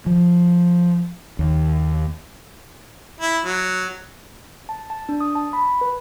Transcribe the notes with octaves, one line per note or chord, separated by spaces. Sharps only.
F3
D#2
E4
F#3
A5
A5
D4
D#6
A5
B5
B4